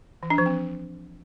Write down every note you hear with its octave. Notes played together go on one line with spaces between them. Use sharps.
E3
D4
F3
C4